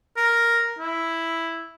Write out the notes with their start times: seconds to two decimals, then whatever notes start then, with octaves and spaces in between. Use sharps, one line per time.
0.17 A#4
0.79 E4